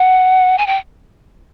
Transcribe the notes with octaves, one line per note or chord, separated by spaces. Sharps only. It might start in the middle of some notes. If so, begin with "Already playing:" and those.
Already playing: F#5
G#5
G5